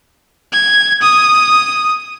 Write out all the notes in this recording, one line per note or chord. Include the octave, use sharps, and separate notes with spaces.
G#6
D#6